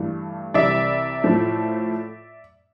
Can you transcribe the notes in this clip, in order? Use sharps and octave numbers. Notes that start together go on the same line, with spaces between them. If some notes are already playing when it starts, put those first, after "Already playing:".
Already playing: G2 E3 A3
C2 C3 E3 G3 D5 E5
A2 F3 A3